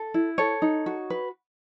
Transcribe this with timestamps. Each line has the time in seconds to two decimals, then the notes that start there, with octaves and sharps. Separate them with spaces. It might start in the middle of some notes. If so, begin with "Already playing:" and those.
Already playing: A4
0.14 E4
0.38 A4 C#5
0.62 D#4
0.86 F#4
1.10 B4